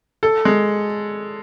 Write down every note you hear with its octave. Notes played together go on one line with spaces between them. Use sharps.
A4
G#3